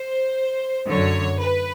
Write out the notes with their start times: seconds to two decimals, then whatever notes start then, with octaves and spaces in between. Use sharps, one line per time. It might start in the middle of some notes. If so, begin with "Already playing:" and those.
Already playing: C5
0.88 F#2 D3 F#3 C#5
1.39 B4